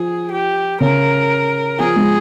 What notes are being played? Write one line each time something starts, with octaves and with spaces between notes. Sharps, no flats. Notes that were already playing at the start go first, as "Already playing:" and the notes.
Already playing: F3 G#4
G4
C#3 A#4
F3 G#4
G#3